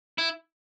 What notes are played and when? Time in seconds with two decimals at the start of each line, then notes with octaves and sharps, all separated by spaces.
0.18 E4